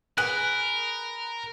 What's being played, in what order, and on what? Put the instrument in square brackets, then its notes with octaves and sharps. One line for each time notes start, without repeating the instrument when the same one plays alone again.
[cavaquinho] G#4 B4 F#5 [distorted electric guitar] A#4 [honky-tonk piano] F#6